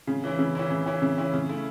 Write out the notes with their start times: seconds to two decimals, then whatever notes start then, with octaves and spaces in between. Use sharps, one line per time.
0.07 C#3
0.24 E3 C#4 E4
0.39 C#3
0.55 E3 C#4 E4
0.70 C#3
0.86 E3 C#4 E4
1.02 C#3
1.18 E3 C#4 E4
1.34 C#3
1.49 A3 E4